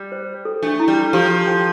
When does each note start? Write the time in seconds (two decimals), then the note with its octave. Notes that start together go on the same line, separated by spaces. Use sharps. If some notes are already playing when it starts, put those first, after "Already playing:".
Already playing: G3
0.12 C5
0.45 A4
0.63 A3 D4
0.80 E4
0.88 G3
0.97 E4
1.13 F3 G4
1.31 A4
1.47 G5